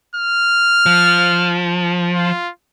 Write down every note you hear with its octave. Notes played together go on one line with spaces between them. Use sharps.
F6
F3
F4